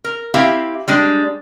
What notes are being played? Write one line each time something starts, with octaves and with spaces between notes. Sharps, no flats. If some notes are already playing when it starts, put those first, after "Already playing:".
A#4
C4 E4 G4 E5 F5
G3 G#3 D4